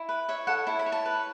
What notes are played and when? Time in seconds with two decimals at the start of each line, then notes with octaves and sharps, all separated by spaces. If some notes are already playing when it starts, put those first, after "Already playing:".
Already playing: E4
0.09 B4
0.29 C#5 E5
0.47 A4 F#5
0.67 E4 A5
0.79 B5
0.86 C#5
0.92 A5
1.06 B4